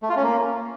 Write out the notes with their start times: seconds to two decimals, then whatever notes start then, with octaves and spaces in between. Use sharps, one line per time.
0.03 A3
0.09 F4
0.16 C#4
0.23 A#3